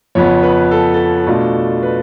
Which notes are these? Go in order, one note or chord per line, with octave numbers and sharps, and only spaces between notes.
F2 C#3 F3 B3 C#5
B4
A4
A4
B2 A3 D4 F4
B4